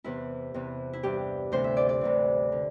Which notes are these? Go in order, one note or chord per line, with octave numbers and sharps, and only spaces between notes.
E2 C3 E3 E4
E2 C3 E3
E4
G2 E3 G4
D2 C3 E3 C5
E5
D5
D5
D2 C3 E3
D3